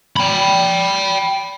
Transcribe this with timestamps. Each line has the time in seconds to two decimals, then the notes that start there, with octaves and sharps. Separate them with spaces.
0.17 G5 B5